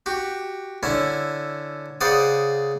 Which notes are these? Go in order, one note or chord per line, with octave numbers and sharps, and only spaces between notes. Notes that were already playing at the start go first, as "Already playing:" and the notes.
F#4 G4
D3 C#4 E4
C#3 C5 D5 F#5 D#6